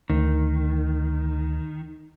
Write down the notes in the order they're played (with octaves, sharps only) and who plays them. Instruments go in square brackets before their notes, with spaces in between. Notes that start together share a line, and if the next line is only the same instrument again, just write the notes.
[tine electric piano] D2 [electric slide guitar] D#3